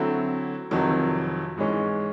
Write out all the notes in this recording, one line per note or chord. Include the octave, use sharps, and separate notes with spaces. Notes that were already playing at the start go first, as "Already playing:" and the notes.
Already playing: D3 F#3 A3 C4 E4
F1 F2 C3 D#3 F#3
G#2 E3 G#3 C#4